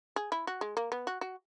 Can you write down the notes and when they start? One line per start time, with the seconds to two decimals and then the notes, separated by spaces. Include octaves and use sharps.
0.16 G#4
0.32 E4
0.47 F#4
0.61 G#3
0.77 A#3
0.92 B3
1.07 F#4
1.21 F#4